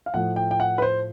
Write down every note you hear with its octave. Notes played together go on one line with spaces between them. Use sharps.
F5
A2 F3 A3 F#5
G5
G5
F#5
B4
C5